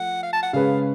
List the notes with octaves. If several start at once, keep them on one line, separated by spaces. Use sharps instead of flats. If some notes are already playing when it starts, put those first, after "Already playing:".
Already playing: F3 A3 F#5
F5
A5
F#5
C#3 G#3 C#4 G#4 B4 F5